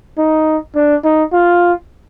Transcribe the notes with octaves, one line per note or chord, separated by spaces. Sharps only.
D#4
D4
D#4
F4